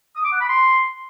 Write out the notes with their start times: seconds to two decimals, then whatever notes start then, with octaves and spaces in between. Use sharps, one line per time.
0.16 D#6
0.24 D6
0.32 F#5
0.41 B5
0.49 C6